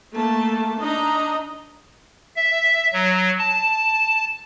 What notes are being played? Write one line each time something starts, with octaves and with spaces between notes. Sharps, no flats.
A3 A#3 A5
D4 D#4 D#5 A#5
E5
F#3
A5